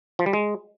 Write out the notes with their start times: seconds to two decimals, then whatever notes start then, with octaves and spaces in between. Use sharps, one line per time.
0.19 F3
0.26 G3
0.33 G#3